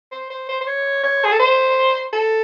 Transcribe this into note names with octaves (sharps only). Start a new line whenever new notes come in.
C5
C5
C5
C5
C#5
C#5
G#4
A4
C5
A4